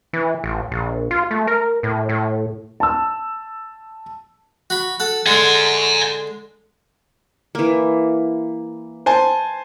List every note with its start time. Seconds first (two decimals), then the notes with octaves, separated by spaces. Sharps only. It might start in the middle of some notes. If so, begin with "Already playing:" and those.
0.13 E3
0.44 A1
0.71 A#1
1.11 F4
1.31 A3
1.47 A#4
1.83 A2
2.09 A2
2.80 A5 E6
4.70 F#4 B5
5.00 A4 F#5
5.27 D3 G#3 F#5 G#5
7.55 E3 A#3
9.06 C5 G#5 A5